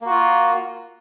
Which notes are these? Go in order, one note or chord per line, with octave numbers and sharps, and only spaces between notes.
A#3 F4 F#4